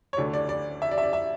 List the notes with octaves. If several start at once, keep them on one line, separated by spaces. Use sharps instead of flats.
C#5
D2 D3 A3 D5
D5
D5
E5
D5
E5
D5
E5